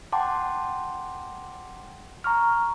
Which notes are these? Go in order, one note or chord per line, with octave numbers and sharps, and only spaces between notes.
F#5 G5 A5 C6 D6
A#5 C#6 F6